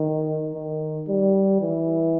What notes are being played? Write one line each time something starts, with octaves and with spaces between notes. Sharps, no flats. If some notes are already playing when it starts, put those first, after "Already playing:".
Already playing: D#3
D#3
G3
E3